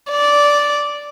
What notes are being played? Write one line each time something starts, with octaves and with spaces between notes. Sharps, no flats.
D5